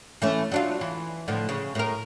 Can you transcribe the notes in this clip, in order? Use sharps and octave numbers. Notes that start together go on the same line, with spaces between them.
E3 A3 C#4
F#3 D4 F4
E3
A2 D3 F3
C#3
A2 A#4